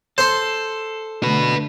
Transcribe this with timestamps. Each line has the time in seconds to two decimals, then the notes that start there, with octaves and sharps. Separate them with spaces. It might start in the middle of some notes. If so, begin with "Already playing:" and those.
0.18 A4 C5 C6
1.23 D3 A3 F#4 B4